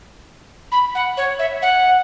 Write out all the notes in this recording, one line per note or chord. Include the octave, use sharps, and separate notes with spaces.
B5
F#5
C#5
E5
F#5